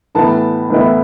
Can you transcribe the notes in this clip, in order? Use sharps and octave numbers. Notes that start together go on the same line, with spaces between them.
A2 E3 B3 E4 A5
A2 E3 B3 E4